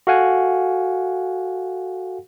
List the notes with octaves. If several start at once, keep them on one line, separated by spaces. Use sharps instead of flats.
F#4 A4 F5 F#5 G#5